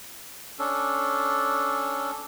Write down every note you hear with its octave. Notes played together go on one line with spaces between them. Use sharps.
C#4 D4 A4